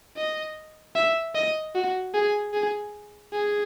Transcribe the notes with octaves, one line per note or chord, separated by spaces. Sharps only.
D#5
E5
D#5
F#4
G#4
G#4
G#4